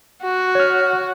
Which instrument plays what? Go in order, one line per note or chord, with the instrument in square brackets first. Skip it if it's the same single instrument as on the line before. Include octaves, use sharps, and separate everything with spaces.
[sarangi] F#4
[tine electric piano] C#5 F6